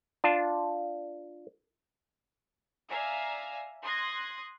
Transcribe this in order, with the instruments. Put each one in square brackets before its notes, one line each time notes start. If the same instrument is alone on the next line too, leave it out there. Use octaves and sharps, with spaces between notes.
[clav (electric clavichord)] D4 F4 A5
[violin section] D5 E5 F5 G#5 A#5
C6 D#6 F#6 G#6 A#6